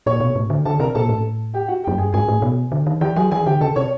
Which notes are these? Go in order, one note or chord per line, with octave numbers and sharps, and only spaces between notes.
A#2 C#5 C#6
B2
A2
D3
D3 A4 A5
C3 A#4 A#5
A#2 A4 A5
A2
G4 G5
F#4 F#5
G4 G5
F#2
G2 G#4 G#5
G#2 G#4 G#5
A2
B2
D3
D#3
E3 G4 G5
F#3 G#4 G#5
E3 G#4 G#5
D3 G4 G5
C#3 A4 A5
C3 C#5 C#6